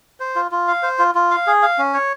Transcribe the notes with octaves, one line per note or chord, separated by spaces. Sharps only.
C5
F4
F4
F5
C5
F4
F4
F5
G#4
F5
C#4
C#5